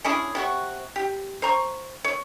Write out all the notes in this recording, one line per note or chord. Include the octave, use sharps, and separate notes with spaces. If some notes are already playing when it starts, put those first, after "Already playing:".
C#4 D4 E4 G#4
C3 F#4 C#6
G4
C5 A#5 C#6
C#5